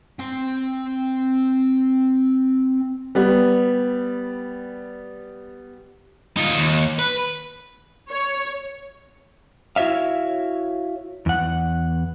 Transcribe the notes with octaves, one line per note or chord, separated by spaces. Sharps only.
C4 C6
G3 B3
D#4 F4
D#2
B4
C#5
E4 F#4 C#5 E5 F5
E2 F#5